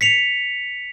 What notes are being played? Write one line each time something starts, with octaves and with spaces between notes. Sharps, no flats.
B6 C#7 F7